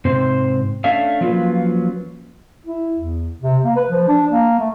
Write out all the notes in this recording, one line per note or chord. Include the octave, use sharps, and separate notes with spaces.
G#2 C3 C4 C5
A3 C#4 D4 E5 F5
F3 F#3 A#3 C#4 F4 B4
E4
E2
C3
A#3
B4
F3
D4
A#3
A3